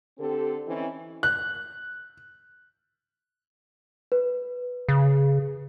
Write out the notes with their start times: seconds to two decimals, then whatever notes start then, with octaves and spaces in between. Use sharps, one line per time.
0.19 D3 C4 G4 A4
0.67 E3 C4 C#4 D#4
1.23 F#6
4.12 B4
4.89 C#3